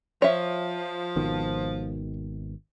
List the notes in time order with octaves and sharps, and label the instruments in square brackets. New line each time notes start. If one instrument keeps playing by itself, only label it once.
[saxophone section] F3 [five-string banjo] C#5 E5
[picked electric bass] G#1 B2 D#3